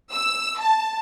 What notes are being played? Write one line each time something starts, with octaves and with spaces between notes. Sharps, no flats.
E6
A5